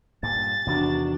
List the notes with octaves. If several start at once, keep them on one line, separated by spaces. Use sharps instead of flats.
G2 A#2 A6
E2 C3 D#3 D4 F#4